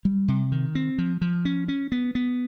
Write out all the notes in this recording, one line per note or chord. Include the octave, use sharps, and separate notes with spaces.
G3
C3
D#3
C4
F3
F3
C#4
C#4
B3
B3